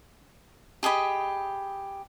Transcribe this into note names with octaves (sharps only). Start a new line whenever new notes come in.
G4 G#4 D#5 B5